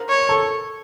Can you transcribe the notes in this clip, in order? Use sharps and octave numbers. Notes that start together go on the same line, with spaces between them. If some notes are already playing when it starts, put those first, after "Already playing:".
Already playing: A#4 C5
C#5
A4